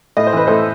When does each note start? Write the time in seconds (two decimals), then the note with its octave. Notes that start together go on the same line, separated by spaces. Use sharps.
0.17 A2 D#5
0.27 C5
0.33 E3 B4
0.47 A2 A4 C5